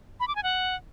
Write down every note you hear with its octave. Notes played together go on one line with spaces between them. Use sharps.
B5
D6
G#5
F#5